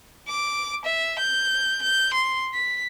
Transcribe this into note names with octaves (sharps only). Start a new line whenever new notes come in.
D6
E5
G6
G6
C6
B6